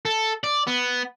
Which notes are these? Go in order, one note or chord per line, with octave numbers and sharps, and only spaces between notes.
A4
D5
B3